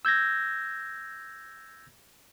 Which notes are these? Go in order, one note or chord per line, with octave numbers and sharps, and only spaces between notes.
E6 G6 G#6 A#6